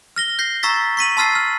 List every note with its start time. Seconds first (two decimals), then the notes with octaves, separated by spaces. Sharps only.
0.16 F6 A#6 G7
0.39 G6 A#6 C7
0.63 A#5 C#6 E6 A6 B6
0.97 C#6 B6 D#7 F#7
1.17 A5 C6 E6 F6 A6 C7
1.35 F6